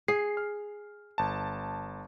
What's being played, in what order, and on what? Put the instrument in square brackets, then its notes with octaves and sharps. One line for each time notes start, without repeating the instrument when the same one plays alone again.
[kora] G#4 [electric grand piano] C7
[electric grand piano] F6
G1 A5